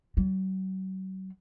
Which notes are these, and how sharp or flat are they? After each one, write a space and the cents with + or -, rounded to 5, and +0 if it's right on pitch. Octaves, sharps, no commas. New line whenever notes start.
F#3 +40